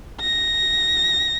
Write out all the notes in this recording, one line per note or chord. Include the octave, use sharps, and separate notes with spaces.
A#6